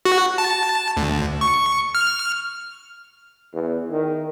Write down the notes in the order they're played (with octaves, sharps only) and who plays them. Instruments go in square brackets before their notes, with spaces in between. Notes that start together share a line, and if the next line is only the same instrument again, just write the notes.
[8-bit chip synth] F#4
A5
D2
C#6
F6
[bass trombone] E2
D#3